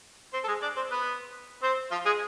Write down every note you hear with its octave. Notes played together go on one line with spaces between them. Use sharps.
C4 C5
A4
G#3 G#4
D4 D5
C4 C5
B3 B4
C4 C5
F3 F4
G#3 G#4